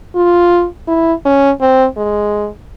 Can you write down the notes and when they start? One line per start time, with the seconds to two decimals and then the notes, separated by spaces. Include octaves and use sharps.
0.15 F4
0.88 E4
1.26 C#4
1.61 C4
1.97 G#3